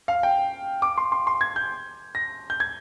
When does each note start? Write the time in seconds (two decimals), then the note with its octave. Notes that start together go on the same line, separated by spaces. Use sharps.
0.08 F5
0.23 G5
0.82 D6
0.97 C6
1.12 C6
1.27 C6
1.41 G#6
1.56 G6
2.15 A#6
2.50 G6
2.60 G#6